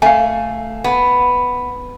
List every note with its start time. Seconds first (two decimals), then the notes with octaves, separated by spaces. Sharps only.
0.02 A3 F5 G#5
0.84 B3